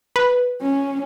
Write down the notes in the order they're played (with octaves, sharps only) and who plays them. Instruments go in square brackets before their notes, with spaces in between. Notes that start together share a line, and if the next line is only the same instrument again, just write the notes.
[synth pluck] B4
[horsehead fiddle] C#4